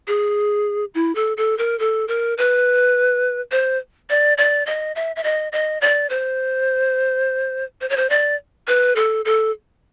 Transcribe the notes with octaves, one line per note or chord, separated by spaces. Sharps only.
G#4
E4
A4
A4
A#4
A4
A#4
B4
C5
D5
D5
D#5
E5
E5
D#5
D#5
D5
C5
C5
C#5
C5
D5
B4
A4
A4